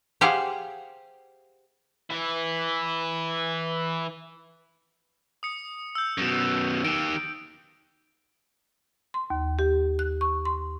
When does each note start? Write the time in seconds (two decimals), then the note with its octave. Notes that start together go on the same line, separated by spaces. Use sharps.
0.21 G4 G#4 C5 F5 F#5
2.10 E3 E4
5.43 D#6 C#7
5.95 E6 G6
6.18 F#2 B2
6.85 D#3 G4 D7
9.14 C6
9.30 D#2
9.59 G4
9.99 F#6
10.21 C#6
10.45 C6